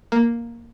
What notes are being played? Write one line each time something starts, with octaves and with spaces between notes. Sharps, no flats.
A#3